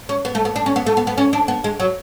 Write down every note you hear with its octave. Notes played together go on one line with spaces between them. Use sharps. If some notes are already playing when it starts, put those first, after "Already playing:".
C#4
B3
A3
B3
D4
C#4
B3
A3
B3
B3
C#4
D4
B3
G#3
F#3